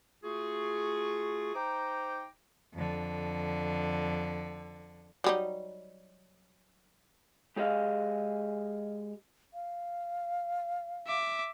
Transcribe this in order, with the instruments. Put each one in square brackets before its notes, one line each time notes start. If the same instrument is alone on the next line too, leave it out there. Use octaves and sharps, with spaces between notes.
[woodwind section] A3 F4 F#4 G#4
D#4 C5 G5 A#5 D6
[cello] F2 D3
[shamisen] F#3 G3 D#4
[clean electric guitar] G#3 G4 G#4 D#5 F5
[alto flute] F5
[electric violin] E5 D6